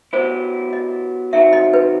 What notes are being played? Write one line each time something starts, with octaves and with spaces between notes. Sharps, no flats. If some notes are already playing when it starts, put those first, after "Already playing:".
F#3 B3 E4 G4 C5
D#5
D#3 F#3 C4 F#4 E5
D#5
B4